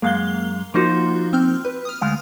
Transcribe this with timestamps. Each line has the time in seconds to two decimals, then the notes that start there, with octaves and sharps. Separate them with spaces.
0.02 F#2 G#3 A#3 F5 G7
0.74 F3 A#3 D#4 F4 F#4 C5
1.33 C4 F6 G6
1.65 B4
1.85 D#6 F6
2.01 D2 G#3 F5